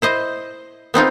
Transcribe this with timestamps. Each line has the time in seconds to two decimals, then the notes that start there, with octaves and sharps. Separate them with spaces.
0.02 E4 C5 D#5
0.94 B3 C4 D#4 F4